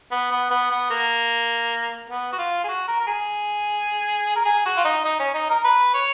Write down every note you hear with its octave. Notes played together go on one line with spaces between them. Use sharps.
B3
B3
B3
B3
A#3
B3
F#4
F4
G#4
F#4
A#4
A#4
G#4
A#4
G#4
F#4
F4
D#4
D#4
C#4
D#4
A#4
B4
C#5